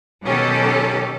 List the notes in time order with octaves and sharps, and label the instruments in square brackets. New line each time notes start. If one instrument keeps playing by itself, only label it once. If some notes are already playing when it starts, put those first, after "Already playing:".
[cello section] B2 D#3 F#3 C#4 G4 A4